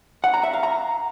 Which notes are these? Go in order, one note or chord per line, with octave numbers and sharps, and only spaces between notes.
F#5
A#5
E5
F5
A#5